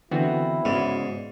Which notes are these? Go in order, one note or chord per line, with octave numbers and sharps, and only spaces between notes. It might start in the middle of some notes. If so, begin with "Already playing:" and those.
D3 E3 B3 C4 E4 F#4
G#2 C#3 B3 F#4 D5